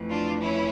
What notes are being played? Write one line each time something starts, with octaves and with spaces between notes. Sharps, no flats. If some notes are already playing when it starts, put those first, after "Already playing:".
Already playing: F2 E3 A3
D4 F4
C#4 E4